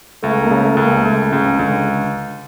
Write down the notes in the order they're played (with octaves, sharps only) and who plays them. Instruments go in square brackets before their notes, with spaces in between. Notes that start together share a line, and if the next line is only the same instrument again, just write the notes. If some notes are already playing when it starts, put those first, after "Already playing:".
[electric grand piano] C#2 [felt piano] A3
[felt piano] A#3
[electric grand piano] C#3
[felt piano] A3
[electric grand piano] C#2
[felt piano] A#3
[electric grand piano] C#2 [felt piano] A3
[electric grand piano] C#2 [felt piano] C#3
[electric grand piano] C#2 [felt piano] D3